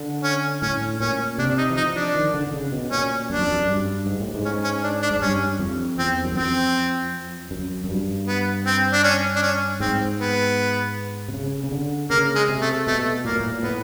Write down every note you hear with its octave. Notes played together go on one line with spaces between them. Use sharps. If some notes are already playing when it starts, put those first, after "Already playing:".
Already playing: D3
C#4
A2 C#4
A#2 C#4
C3 D4
D#4
E3
F3 D#4
D4
D#3
D3
D3
C#3
B2
A#2 C#4
F#2 D4
F2
F#2
G2
G#2
A2
G#2
C#4
C#4
D4
D4
G#2
G2 C#4
F2
E2 C4
F#2
F2 C4
F#2
F#2
G2
B3
C4
D4
C#4
D4
C#4
G#2 C4
B3
C3
C#3
C#3
D3
C#3 A#3
G#3
C3
A3
B2 A3
A#2 A#3
A2
A#2
A2 B3